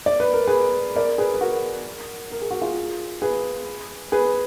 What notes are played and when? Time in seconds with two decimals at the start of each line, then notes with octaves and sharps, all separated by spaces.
0.06 D5
0.20 B4
0.33 A#4
0.47 G#4 B4
0.96 A#4 D5
1.18 G#4 B4
1.34 B4
1.41 F#4 A#4
2.32 A#4
2.42 G#4
2.51 F#4
2.61 F4 G#4
3.22 G#4 B4
4.12 G#4 B4